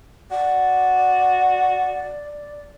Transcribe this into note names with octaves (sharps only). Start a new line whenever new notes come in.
F#4 D5